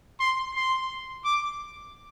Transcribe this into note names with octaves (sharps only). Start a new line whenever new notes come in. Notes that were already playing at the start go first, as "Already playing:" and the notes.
C6
C6
D6